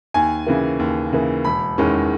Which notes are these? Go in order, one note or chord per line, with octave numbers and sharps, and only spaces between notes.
D#2 G#5
C#3 E3 A#3
D#2
C#3 E3 A#3
E1 B5
E2 D#3 G#3 C#4